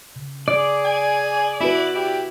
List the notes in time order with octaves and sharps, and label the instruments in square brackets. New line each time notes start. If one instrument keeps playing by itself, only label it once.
[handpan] C#3
[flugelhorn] G#4 [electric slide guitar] D5
[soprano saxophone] G#5
[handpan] B3 F#4 B4 [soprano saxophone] E4
[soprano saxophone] E4 [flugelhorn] G4